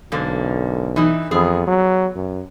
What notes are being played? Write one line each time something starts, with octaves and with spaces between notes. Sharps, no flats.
B1 G#2 D3 A#3
E3 D#4 E4
F2 E3 B3 G#4
F#3
F#2